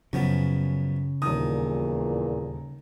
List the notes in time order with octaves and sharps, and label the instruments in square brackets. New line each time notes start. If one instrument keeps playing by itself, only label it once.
[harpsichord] F#2 F3 B3 [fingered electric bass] C#3
[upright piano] D#1 D#6 [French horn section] E2 A#2 E3 [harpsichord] D#3